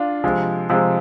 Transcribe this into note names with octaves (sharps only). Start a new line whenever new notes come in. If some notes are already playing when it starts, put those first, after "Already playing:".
Already playing: D4 F4
C3 F3 G#3
C3 F3 G#3